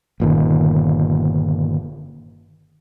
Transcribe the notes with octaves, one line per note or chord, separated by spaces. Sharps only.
G1 A#2 D#3